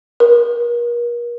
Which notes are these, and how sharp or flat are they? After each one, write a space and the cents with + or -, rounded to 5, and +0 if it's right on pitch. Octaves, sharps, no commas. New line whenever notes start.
A#4 +40